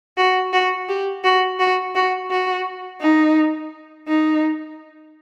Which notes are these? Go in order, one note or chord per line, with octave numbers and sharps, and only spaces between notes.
F#4
F#4
G4
F#4
F#4
F#4
F#4
D#4
D#4